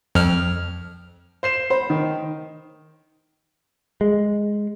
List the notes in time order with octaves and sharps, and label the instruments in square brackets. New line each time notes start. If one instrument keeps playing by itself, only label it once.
[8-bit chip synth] F2 F6
[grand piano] C5 C7 E7
[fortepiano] C5 [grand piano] B5
[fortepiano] D#3
[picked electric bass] G#3